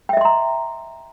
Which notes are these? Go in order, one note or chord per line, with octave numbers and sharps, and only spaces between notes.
D#5 E5 G5 A#5 C6